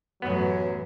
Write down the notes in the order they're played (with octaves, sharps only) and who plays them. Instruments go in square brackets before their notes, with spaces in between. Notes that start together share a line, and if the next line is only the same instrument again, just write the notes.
[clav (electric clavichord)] A1 B3 [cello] F#2 [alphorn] F#3